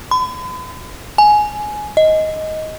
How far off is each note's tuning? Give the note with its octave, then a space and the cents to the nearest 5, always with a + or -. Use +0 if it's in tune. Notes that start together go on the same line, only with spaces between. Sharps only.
B5 +45
G#5 +15
D#5 +10